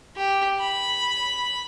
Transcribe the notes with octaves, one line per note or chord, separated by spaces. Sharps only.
G4
B5